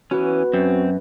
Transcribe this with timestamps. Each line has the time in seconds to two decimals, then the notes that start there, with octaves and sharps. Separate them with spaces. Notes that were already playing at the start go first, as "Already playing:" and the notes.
0.11 E3 B3 C#4 F#4
0.53 F#2 C4